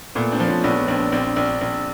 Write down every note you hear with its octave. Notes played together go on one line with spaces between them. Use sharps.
A#2 A3 B3
C4 D4
F3
B3 C#4
A#1 B3 C#4
A#1 C4 D4
A#1 C4 D4
A#1
A#1